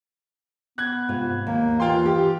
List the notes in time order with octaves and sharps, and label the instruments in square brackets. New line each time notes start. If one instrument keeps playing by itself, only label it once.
[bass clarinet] B3 [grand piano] F#6 G#6
[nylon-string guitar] G#2 C3 F4
[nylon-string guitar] D#2 [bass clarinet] A#3
[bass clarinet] E3 [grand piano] F4 G5 C6
[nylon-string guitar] G4